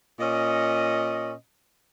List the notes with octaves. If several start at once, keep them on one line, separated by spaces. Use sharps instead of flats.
A#2 C#4 D#5